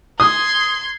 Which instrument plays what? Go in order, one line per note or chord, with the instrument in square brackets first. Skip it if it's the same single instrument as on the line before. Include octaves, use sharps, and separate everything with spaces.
[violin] C6 G#6 [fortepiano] D#6